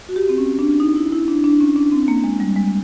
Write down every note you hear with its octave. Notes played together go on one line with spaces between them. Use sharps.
F#4
G4
C4
C#4
D4
D#4
E4
E4
D4
D4
C#4
D4
C4
A#3
G#3
G3
G#3